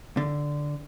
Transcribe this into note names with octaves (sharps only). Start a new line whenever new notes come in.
D3